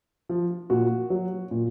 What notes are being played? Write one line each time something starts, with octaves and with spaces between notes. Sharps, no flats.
F3
A#2 F#4
F#3
A#2